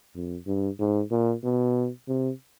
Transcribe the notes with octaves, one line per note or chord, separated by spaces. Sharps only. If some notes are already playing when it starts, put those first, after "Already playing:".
F2
G2
G#2
A#2
B2
C3